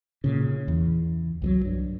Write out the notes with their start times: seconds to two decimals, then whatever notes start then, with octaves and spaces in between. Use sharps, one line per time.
0.24 A#2 C#3
0.68 E2
1.42 C2 F3 F#3
1.65 G2